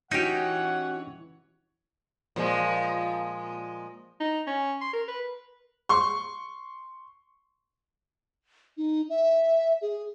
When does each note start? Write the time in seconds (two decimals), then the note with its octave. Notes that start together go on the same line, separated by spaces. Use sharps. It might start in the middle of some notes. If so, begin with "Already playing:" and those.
0.11 E3 C#4 D#4 F#4 G4 C#5 F#5 G5
2.36 A#2 F3 G#3
4.20 D#4
4.47 C#4
4.81 C6
4.93 A#4
5.08 B4
5.89 C6 C#6
8.77 D#4
9.10 E5
9.81 G#4